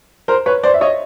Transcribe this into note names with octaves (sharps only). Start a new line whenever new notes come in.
A#4 C5
B4 C#5
C5 D5
E5
C#5 D#5